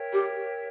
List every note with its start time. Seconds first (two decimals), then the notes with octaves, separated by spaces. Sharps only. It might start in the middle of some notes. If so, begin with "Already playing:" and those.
Already playing: A#4 C#5 E5 G5
0.13 G4